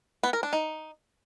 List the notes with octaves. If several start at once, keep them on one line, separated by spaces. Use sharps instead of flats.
B3
A#4
D4
D#4